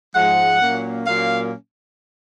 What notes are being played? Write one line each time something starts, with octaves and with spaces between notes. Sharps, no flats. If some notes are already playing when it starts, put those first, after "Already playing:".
G#2 F3 G#3 F#5
A#2 F#3 A#3 C#4
A#2 F#3 A#3 C#4 F5